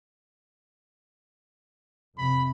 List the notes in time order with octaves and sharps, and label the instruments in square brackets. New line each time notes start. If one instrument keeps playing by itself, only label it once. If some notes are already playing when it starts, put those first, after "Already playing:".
[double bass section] F2 C3 [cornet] B5